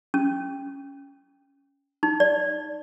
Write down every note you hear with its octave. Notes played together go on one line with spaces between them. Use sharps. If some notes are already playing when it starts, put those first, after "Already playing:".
C#4
D#4
D5